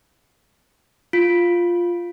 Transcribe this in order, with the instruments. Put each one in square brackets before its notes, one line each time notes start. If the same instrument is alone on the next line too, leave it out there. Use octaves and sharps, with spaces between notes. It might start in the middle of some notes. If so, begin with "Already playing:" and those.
[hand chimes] F4